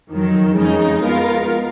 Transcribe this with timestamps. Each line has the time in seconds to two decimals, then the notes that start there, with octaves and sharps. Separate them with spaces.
0.11 F2 D#3 F#3
0.55 F2 C#3 G#3 D#4
1.02 G#3 B3 F4 A#4 F5